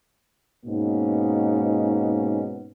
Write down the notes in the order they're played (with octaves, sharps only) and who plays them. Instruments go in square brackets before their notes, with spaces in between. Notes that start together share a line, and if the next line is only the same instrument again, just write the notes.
[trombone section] G#2 B2 A#3 B3 C#4 D#4